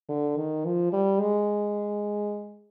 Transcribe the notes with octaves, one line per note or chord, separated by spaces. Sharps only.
D3
D#3
F3
G3
G#3